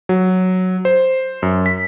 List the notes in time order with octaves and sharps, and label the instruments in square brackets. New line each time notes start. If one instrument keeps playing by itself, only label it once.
[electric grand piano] F#3
C5
F#2
B6